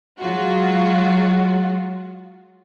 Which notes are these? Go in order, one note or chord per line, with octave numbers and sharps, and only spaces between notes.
F#3 G#3 F4 F#4